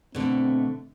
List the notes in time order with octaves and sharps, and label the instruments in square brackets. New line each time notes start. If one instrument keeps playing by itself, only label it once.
[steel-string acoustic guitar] B2 D3 A3 [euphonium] C4